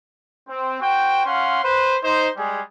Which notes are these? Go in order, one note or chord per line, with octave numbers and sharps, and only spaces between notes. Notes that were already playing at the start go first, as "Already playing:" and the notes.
C4
F#4 C5 G5
C#4 F5 F#5 C6
B4 C5
D#4 C5
G3 G#3 G#4